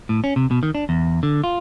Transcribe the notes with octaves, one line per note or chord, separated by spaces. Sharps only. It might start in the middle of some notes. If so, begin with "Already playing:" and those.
A2
C#4
C3
B2
D#3
D4
E2
D3
F4